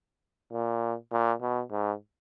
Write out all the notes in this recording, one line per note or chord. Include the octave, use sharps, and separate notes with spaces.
A#2
A#2
B2
G#2